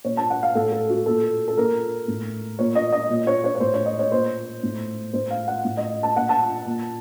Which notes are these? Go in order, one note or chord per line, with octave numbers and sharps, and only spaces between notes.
A#2 C#5
A5
F#5
F5
A2 A4
A4
F#4
A#2 A4
A4
A#2 A#4
A2
A#2 C#5
D#5
D#5
A#2
C#5
C#5
C#5
A2 C5
C#5
D#5
C#5
A#2 C5
A2
A2 C5
F5
F#5
A2
D#5
A5
A#2 F#5
A5
A#2